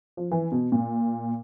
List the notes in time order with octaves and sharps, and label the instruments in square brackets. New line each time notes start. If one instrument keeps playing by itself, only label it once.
[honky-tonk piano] F3
E3
B2
A#2